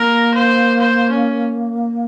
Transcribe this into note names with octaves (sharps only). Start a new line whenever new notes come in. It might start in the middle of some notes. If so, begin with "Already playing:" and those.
Already playing: A#3 A#4
C5
C5
C#4